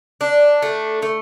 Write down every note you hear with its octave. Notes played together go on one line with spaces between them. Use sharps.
D4
A3
A3